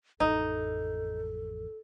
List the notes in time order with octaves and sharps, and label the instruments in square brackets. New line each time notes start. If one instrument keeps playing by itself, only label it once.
[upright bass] A1 F2 [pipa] D#4 [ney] A4